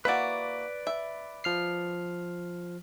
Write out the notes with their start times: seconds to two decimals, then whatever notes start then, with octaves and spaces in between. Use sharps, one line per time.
0.05 A#3 E4 F#4 B4 D5
0.87 E5
1.44 F3 F6 C7